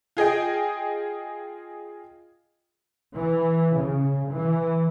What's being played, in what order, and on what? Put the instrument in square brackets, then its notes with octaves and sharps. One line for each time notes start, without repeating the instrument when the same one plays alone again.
[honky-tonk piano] F4 G#4 D#5 G5
[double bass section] E3
C#3
E3